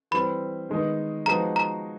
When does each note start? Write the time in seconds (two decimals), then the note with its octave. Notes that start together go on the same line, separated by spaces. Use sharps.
0.11 E3 G3 C4 B5
0.69 D#3 G#3 B3 D#4
1.26 F3 G#3 B3 D#4 F#4 A#5
1.56 A#5